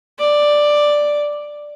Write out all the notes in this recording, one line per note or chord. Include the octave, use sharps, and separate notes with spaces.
D5